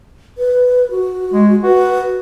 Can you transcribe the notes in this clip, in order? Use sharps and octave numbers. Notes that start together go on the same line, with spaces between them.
B4
F#4
G#3
F#4 B4